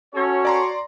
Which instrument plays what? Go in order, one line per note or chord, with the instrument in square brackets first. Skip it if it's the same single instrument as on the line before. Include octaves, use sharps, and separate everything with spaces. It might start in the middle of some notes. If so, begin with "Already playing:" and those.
[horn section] C#4 A4 [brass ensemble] F#4 C#5
[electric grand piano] D5 A#5 C6